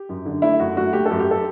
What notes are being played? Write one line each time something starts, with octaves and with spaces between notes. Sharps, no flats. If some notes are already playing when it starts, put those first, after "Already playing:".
Already playing: G4
F#2
D3
A3 E4
F#2 F#4
A3 F#4
A3 G4
A4
F#2
G4
A4